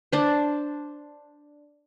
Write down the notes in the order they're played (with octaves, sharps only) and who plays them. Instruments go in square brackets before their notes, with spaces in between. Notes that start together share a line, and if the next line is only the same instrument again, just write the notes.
[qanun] D4 C5